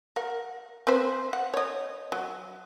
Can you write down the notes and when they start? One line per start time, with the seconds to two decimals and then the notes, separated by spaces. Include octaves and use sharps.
0.16 A#4 F#5
0.87 C4 B4 C5
1.33 F#5
1.54 C#5 D#5
2.12 F#3